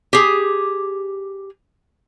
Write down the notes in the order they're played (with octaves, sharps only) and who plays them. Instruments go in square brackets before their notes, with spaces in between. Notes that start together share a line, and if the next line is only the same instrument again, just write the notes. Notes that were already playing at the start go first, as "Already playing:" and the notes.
[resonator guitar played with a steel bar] G4 G#4